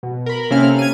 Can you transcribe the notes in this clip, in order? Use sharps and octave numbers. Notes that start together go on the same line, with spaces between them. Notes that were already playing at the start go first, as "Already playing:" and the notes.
B2
A#4 B5
C3 A#3 C#4 A4 F5 F6
G#6 D#7